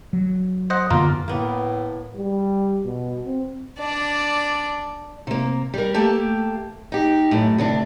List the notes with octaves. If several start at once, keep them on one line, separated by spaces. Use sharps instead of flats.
F#3
C5 D#5 F#5
F#2 D3 A#3 B3 F4 A#4
A2 A#3 B3
G3
B2
C4
D4 D5
C3 A#3
G3 A#4
A3 A#3 G4 A4
D#4 G4
F#2 A2
D2 C3 D4